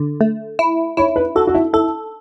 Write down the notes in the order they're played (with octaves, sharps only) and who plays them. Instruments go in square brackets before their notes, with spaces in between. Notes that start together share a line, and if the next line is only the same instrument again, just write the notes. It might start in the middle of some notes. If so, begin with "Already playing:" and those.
Already playing: [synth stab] D3
A3
E4
[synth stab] E4 [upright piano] C#5
[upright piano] B4
[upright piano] F#4 [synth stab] A4
[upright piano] F#4
E4
[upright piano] E4 [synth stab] A4